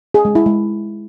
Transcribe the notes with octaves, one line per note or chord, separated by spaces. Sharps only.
G#4
G#3
E4
G#3